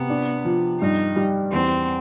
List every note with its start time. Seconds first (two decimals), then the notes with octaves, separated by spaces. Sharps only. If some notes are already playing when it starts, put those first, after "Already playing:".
Already playing: C3 B3
0.10 D4
0.45 F3
0.81 G2 D#4
1.16 G3
1.52 E2 C4